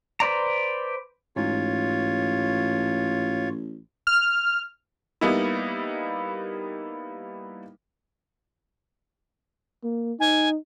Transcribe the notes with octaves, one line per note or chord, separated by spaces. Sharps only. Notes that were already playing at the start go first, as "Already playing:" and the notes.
B4 C5 D5 A#5
A1 G#2 F4 C#5
F6
G3 A#3 B3 D#4 E4
A#3
D#4 G#5